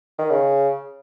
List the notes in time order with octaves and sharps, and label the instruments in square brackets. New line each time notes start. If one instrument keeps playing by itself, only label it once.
[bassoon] D#3
C#3